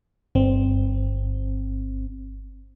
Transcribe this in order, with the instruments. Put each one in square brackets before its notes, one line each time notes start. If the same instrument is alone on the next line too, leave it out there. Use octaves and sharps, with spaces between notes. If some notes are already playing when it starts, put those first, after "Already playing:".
[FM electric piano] G1 C4